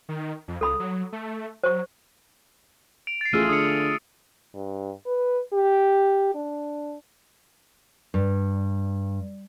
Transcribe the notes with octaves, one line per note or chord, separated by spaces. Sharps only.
D#3
F2
C#2 A4 B5 D#6
F#3
A3
F#3 C5 C#6
D7 F7
A6 C7
A1 A3 F4 G#4 E6 F6 D#7
D3 D#6 C#7
G2
B4
G4
D4
G2